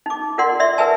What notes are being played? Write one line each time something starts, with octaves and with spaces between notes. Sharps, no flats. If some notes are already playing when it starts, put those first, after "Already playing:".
D#4 D6
F4 A#4 D5 F#5 C6
D5 E5 C6
A#4 B4 E5 G#5 A5